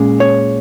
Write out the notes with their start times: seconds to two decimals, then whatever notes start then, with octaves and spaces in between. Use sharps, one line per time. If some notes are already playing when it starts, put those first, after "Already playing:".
Already playing: A#2 G#3 C#4
0.20 C#5